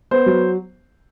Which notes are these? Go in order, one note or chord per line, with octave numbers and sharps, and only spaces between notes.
B3 C5
F#3